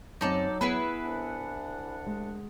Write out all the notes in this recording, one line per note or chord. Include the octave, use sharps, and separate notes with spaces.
F#2 F#3 C4 D#4 A4 D5
B3 E4 G#4 B4
C2 D4 F#5
G#3